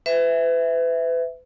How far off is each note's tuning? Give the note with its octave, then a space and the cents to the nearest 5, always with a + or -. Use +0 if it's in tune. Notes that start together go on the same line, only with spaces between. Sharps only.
B4 +35 E5 +0